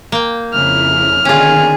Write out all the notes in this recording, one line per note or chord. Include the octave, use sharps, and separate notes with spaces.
A#3 G5
F2 C#3 E4 F6
B2 D3 D#3 C#4 F4 G#4